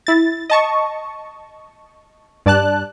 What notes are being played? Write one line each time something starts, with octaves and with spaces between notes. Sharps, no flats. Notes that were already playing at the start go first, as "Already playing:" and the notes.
E4 A6
D#5 A5 C#6
G2 D5 A5 F#6